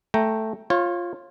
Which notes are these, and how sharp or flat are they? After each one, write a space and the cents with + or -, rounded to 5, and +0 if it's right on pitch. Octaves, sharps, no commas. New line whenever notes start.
A3 +0 G5 +0 A#5 +0
F4 +0 C#5 -30